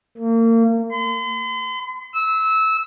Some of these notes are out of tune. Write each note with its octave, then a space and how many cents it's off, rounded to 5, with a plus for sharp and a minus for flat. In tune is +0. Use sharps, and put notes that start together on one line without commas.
A#3 -35
C6 -45
E6 -20